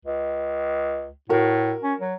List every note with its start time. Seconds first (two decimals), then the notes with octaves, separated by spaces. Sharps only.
0.05 C#2
1.29 A2 F#4 A#4
1.83 C#4
2.00 F#3